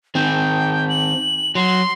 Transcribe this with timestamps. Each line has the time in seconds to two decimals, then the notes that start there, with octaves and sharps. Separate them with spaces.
0.15 D#3 C4 G5
0.89 F#7
1.55 F#3 C6